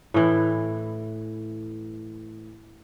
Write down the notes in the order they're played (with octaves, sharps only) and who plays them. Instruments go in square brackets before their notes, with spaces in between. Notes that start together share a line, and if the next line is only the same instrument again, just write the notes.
[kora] A2 E3